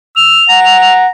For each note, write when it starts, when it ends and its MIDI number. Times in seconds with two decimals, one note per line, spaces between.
0.16 0.43 88
0.16 0.93 101
0.49 1.09 78
0.49 1.11 82